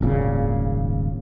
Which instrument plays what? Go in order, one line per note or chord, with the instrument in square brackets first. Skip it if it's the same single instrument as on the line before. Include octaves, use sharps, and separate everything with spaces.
[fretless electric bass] D#1 G#1 A#2 C#3